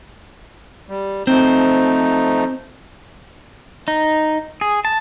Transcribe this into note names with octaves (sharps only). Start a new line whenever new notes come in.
G3
F3 A3 C4 D#4
D#4
G#4
A5